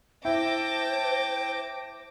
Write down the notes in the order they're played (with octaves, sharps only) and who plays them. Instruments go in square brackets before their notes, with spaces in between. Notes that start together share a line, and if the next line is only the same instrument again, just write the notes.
[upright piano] E4 [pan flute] C5 [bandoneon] G5 [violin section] A5 D6 A#6